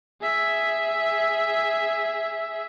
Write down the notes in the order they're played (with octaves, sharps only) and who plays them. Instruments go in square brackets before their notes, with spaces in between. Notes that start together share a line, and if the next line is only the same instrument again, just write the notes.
[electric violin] G#4 E5